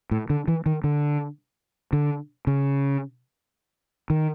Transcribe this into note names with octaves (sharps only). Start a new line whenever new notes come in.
A2
D3
E3
D#3
D3
D3
C#3
D#3